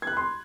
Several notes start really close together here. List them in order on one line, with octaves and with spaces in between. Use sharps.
G#6 F#6 B5 C6